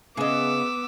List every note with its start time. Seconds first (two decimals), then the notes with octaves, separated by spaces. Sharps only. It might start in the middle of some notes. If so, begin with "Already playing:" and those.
0.17 C#3 B3 G#4 D#5 D6 E6